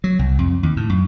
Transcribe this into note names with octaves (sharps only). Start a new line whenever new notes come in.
F#3
C2
F2
D#2
A2
F#2